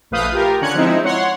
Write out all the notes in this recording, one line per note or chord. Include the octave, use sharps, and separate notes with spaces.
A#1 A3 B4 F5 D#6 G6
F4 G4 A#4
D3 C#4 F#6 G#6 C#7
F3 G#3 C4 D#4 E4
C#5 F#5 C6